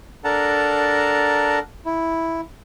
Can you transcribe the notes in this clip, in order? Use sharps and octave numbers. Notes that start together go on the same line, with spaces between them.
D4 A4 A#4 F#5 A5 A#5
E4